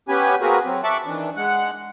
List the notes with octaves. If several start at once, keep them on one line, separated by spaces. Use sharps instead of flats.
B3 C#4 G4 B4 G#5
A#3 C4 F#4 G#4 A#4 B4
F#3 C4
E5 A5 C#6 D6 F#6
D#3 E3 D4
G#3 F#5 F#6